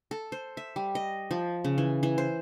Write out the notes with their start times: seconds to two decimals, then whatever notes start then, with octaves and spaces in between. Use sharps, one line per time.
0.11 A4
0.32 C5
0.57 E5
0.76 G3
0.95 D#5
1.31 F3
1.64 C#3
1.78 E3
2.03 E3
2.18 C5